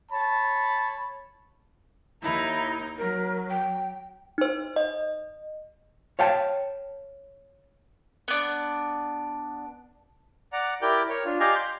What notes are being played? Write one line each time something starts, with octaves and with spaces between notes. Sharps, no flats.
C#5 A5 B5
D#2 D#4 E4 A#4
F#3 A#4
G5
D#4 C5
D#5
C#5 F5 G5 A5
B3 D4
D5 F#5 A#5
E4 G4 A#4 D5 G5 G6
A#4 C#5
D4 F4
G4 D5 D#5 F5 G#5 A#5
C6 G6